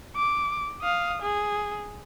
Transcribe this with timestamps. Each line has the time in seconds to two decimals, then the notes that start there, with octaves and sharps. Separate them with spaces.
0.16 D6
0.82 F5 D#6
1.22 G#4